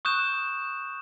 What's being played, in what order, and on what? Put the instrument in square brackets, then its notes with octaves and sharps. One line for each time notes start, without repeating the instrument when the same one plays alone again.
[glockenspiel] C#6 D#6 F#6 G6 E7